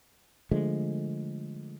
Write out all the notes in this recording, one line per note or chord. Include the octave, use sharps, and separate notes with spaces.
D3 F3 G#3 A3